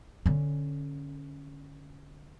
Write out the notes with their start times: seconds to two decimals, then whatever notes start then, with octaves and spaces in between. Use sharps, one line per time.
0.26 D3 C#4